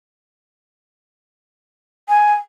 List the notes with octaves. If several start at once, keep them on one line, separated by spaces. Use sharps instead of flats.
G#5